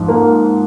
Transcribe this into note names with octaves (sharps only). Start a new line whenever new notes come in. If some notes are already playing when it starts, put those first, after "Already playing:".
Already playing: G#2 F3
A#3